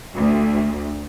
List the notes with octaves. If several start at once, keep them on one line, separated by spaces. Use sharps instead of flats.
D2